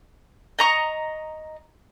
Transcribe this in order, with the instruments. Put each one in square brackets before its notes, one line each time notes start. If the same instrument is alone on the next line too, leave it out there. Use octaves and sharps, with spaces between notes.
[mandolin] D#5 A#5 C#6